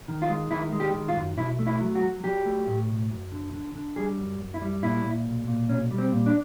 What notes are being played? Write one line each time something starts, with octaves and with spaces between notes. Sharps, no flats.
D#3
F4
G#3
D#3 E4
G#3
G4
D#3
F4
F#2
B1 E4
A3
E4
F#3
F#4
F#3
F#3 G4
A3
A2
B1
F#2
D3
D3
D3
G3 G#4
F#2
F#2
E4
G3
A#2 E4
A#2
B1
A#2
B1 C#4
G3
C4
A#2
D4